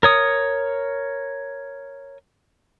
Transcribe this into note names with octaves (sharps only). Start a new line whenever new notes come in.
A#4 C#5 D#6